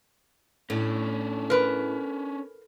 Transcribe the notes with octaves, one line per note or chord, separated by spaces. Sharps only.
A2 C#4 D4
A#4 B4